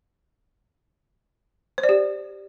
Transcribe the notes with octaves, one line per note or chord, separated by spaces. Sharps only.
C5
D5
G4